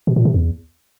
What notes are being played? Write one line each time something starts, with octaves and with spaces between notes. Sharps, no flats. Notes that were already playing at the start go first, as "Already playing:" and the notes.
B2
A#2
C3
E2